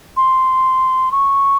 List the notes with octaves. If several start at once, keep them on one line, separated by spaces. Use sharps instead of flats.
C6
C#6